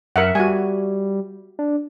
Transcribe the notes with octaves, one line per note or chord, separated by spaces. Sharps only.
F#2 A#4 E5 F#5
G3 F#4 G#5
D4